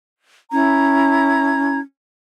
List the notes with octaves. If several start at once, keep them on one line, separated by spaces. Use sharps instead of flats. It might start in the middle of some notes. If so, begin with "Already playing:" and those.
C#4 E4 A#5 G#6